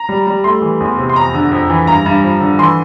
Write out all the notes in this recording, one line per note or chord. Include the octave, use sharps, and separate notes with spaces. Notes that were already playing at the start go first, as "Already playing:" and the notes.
Already playing: A#5
G3
G3
A3 C6
E3
E2
C3
C6
F2 A#5
D3
F2
E3
G2 A#5
G2
F3
D3
E3 C6